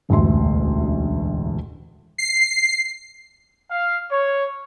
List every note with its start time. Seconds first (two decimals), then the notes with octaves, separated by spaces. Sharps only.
0.09 E1 A1 D2 E5 C6
2.18 C7
3.71 F5
4.11 C#5